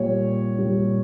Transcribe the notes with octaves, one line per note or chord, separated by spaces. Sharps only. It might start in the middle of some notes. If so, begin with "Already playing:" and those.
Already playing: A#2 G3 C#5
A#2 G3